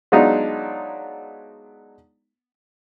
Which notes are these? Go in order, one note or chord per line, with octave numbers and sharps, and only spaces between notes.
F#3 G#3 B3 D4 D#4 F4